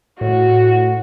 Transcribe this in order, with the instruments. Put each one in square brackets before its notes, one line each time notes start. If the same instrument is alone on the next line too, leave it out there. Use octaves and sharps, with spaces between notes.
[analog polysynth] A2 [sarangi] F#4